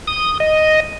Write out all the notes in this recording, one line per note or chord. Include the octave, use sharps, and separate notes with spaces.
D#6
D#5